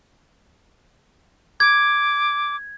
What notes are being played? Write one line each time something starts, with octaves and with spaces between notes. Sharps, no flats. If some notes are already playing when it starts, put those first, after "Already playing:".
D6 G#6